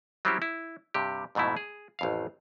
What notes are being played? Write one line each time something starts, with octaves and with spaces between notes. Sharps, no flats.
F#3 G3 C4 C#4 E4 G4
E4
G2 C3 G4
F2 G#2 B2 A3 E4
G#4
A1 F2 F5